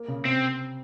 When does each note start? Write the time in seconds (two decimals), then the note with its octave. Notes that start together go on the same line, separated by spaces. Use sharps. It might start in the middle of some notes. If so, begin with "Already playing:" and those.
Already playing: A#3
0.08 C#3
0.25 C3 C4